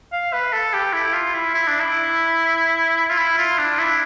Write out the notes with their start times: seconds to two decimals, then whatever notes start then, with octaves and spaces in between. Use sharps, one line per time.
0.13 F5
0.33 B4
0.53 A4
0.73 G4
0.93 E4
1.14 F4
1.35 E4
1.55 E4
1.68 D4
1.80 E4
3.10 F4
3.18 E4
3.38 F4
3.59 D4
3.79 E4